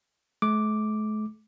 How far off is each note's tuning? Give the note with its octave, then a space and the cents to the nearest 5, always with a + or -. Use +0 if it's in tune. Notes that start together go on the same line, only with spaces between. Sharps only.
A3 -45 D6 +0